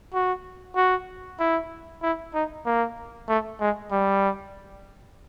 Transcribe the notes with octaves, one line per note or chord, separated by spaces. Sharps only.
F#4
F#4
E4
E4
D#4
A#3
A3
G#3
G3